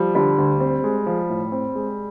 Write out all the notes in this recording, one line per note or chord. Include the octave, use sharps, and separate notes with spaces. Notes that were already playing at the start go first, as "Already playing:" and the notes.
Already playing: F3 G3
D3 G3
D2
C4
G#3
F3
A2
C4
G#3